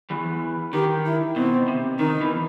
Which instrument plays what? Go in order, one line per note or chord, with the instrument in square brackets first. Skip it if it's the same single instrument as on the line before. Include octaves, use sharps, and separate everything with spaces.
[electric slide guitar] E2 E3
[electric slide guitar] D#3 [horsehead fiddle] G4
[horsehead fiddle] E4
[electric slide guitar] B2 [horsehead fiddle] C4
[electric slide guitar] C3
[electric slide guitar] D#3 [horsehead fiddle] D#4
[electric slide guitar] E2 E3